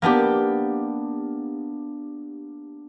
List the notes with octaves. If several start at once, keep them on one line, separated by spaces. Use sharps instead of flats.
A#3 B3 D4 G4